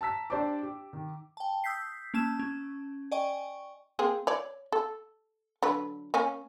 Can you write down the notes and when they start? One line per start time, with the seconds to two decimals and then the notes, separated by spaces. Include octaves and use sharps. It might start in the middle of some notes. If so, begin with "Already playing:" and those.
0.01 A5 A#5 E6 B6
0.30 D4 G4 C5 D5 A5 D6
0.63 G4
0.93 D#3
1.37 G5 A5
1.64 D#6 E6 G6 B6 C7
2.14 A#3 C#4 A5 E6 E7
2.39 C#4
3.11 D5 D#5 G5 G#5 C#6
3.99 A#3 C4 G#4
4.27 C#5 D5
4.72 A4
5.62 D3 F#3 B4
6.14 A#3 C#4 G#5